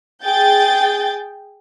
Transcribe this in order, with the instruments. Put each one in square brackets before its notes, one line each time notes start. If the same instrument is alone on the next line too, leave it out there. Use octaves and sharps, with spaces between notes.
[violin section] G#4 G5 G6 A6